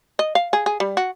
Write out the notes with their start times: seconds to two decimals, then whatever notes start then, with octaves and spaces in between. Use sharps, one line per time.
0.19 D#5
0.35 F5
0.53 G#4
0.66 G#4
0.80 G3
0.97 F#4